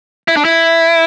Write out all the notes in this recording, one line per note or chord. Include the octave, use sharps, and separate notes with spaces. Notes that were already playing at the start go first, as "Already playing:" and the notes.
E4
D4
E4